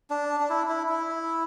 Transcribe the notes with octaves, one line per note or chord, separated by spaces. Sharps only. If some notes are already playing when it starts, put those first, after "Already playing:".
D4
D4
E4
E4
E4